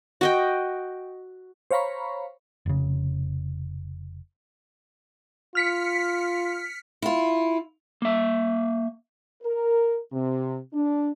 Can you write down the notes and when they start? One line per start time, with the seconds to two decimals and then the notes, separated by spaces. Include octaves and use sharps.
0.21 F#4 D#5 G5
1.71 C5 C#5 F5 A#5 B5 C#6
2.66 F1 C#3
5.55 F4 F6 B6 C#7
7.02 E4 F4
8.02 A#3 E5
9.42 A#4
10.12 C3
10.72 D4